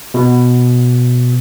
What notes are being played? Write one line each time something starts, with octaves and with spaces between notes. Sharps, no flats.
B2